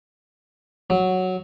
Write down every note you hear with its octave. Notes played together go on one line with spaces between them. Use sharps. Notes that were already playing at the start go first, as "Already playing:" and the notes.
F#3